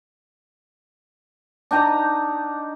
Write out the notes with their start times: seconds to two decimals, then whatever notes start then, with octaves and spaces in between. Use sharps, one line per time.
1.71 D4 D#4 G5 A#5